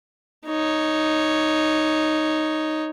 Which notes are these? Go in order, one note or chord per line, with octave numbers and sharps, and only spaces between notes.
D#4 C#5